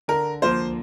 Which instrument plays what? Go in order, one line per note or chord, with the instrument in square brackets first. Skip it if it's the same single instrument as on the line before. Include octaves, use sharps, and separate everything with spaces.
[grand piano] D3 [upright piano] A#4
[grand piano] F3 A#3 F4 [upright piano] C5